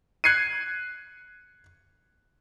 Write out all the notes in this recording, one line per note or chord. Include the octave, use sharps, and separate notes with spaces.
F#6 G#6 C7 C#7 D#7